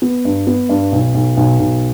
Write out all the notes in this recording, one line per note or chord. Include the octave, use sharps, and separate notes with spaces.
B3
G2
B3
G2
B1
B1
B1
B1